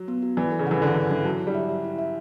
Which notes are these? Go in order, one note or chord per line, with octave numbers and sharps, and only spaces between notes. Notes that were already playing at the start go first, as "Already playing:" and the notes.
Already playing: F#3
B3
F#4
E3 D5
A4
C#3
E3 F#5
D3 D5
E3 A4
E3 D4
F#3 A5
E4
G3
E5
E5
E4
E5